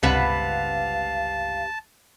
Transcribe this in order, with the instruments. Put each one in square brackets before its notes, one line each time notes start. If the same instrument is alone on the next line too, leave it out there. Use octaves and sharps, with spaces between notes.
[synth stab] G1 C#2 G2 [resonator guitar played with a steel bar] C3 B4 F#5 [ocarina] F5 [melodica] A5